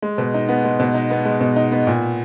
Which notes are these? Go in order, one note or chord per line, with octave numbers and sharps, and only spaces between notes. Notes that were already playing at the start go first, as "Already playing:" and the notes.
G#3
B2
D#4
B3
G#3
B2
D#4
B3
G#3
B2
D#4
B3
A#2